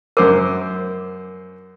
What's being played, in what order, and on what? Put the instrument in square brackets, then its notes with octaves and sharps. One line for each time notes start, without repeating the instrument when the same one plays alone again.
[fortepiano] F#2 C5 D6 [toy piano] A#4